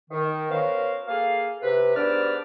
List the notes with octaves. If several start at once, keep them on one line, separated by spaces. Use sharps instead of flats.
D#3
B3 C#4 F#4 A#4 C5 F5
A#3 G#4 A4 F5
C3 B4
G#2 B3 D4 G4 D5 F6